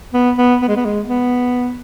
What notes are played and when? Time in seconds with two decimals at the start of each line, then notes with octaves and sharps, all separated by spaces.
0.14 B3
0.38 B3
0.62 B3
0.69 G#3
0.77 B3
0.85 G#3
1.08 B3